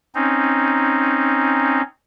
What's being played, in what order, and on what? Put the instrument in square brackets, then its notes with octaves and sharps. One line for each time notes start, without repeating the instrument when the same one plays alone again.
[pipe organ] C4 C#4 D#4